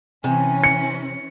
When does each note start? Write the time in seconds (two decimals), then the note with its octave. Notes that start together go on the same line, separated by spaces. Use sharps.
0.24 C3 E3 C#4 G#5
0.64 C#7